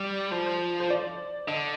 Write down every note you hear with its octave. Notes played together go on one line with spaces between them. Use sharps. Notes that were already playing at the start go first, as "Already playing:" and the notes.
Already playing: G3 D5
F3 C5
C5
C5
D5
D3 D#5